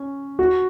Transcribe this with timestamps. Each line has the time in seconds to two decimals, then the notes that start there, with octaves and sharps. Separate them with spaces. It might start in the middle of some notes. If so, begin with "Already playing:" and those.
Already playing: C#4
0.39 F#4